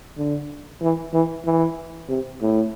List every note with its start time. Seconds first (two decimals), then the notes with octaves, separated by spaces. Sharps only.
0.17 D3
0.82 E3
1.13 E3
1.45 E3
2.09 C3
2.42 A2